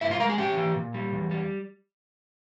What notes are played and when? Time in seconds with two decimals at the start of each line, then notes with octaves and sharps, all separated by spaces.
0.01 G2 E4 E5
0.11 F4 F5
0.20 G#3 A#4 A#5
0.29 G#4 G#5
0.38 C#4 G4 G5
0.57 E3
0.76 A#2
0.94 G3
1.13 E2
1.31 G3